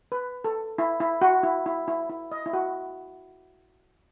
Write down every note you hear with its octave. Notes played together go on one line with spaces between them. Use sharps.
B4
A4
E4
E4
F#4
E4
E4
E4
E4
D#5
E4
F#4